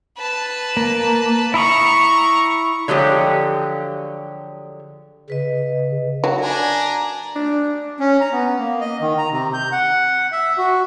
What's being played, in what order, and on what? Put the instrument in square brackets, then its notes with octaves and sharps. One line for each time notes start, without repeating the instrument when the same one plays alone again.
[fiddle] B4 A5
[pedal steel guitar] A#3
[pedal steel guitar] E4 B5 D#6 [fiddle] A#5 C#6
[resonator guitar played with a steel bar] D3 F3 F#3 G#3 G4
[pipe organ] C#3 [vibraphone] B4 D#5
[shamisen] F#3
[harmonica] D4 G#5 A#5
[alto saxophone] D4
[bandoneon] C#4
A#5
B3
A#3
D#5
D#3
A#5
C3
G6
F#5
E5
F#4